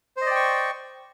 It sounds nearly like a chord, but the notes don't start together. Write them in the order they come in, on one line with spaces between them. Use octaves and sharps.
C5 D#5 D5 G5 C#6